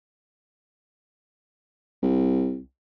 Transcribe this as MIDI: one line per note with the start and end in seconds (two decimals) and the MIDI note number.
2.03 2.60 36